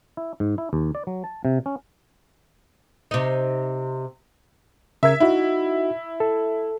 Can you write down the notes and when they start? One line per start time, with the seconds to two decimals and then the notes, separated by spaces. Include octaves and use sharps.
0.17 E4
0.40 G#2
0.58 E4
0.73 D#2
0.95 D5
1.07 F#3
1.24 A5
1.45 C3
1.66 C#4
3.11 C3 D#4
5.03 C#3 A#4 E5 G#6
5.20 D#4 E4 F#4
6.20 A4